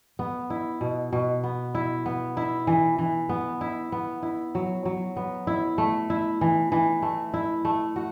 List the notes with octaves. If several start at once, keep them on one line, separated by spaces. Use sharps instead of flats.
B3
E4
B2
B2
B3
E4
B3
E4
E3
E3
B3
E4
B3
E4
F#3
F#3
B3
E4
A3
E4
E3
E3
A3
E4
A3
F#4